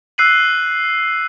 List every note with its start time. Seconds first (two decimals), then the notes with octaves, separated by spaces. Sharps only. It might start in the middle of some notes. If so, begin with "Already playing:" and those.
0.18 E6 F#6 C7 D#7 F#7